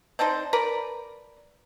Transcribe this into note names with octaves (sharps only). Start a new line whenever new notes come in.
C4 D4 D#4 C5
A#4 B4 D5